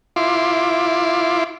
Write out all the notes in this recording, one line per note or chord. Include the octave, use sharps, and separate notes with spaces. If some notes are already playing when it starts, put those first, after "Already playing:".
E4 F4 C6 D6